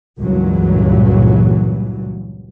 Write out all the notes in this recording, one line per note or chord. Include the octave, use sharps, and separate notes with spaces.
C#2 G2 A#2 E3 F#3